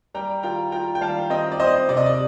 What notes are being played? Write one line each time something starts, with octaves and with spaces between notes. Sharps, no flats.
G3 G5 A#5
F4 G5 A#5
F4 G5 A#5
G5
G3 F5 A5
C4 D#5 G5
D5
C4 C5 D#5
C3 D5
D#5
D5